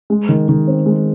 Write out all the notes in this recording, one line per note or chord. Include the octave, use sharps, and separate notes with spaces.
G#3
D#3
D#3
C4
G#3